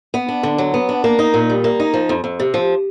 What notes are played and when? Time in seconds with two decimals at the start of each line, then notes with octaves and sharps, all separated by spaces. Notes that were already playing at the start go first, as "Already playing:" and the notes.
0.14 B3
0.29 D4
0.43 D3
0.58 F#3
0.74 B3
0.89 D4
1.04 A#3
1.19 D#4
1.34 A#2
1.50 G3
1.64 A#3
1.80 D#4
1.94 F3
2.09 F2
2.24 F2
2.39 C3
2.54 F3